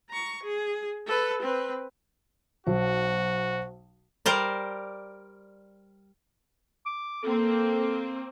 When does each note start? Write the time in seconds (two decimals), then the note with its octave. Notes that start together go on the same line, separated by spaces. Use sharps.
0.10 A#5 C#6
0.43 G#4
1.07 A4 B4
1.42 C4 B4
2.67 B1 F#4 C5
4.26 G3 A#4 C5 D5
6.86 D6
7.23 A#3 C4 A4